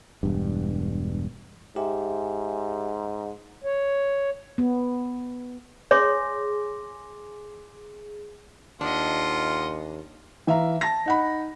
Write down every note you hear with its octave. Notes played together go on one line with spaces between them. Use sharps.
E1 G2
G#2 G4 E5 G#5
C#5
B3
G#4 C#5 C6 D6 A#6
D#2 D4 F4 D#5 F#5
E3 E5 F5 A#5
A5 A#6
D#4 F#5 B5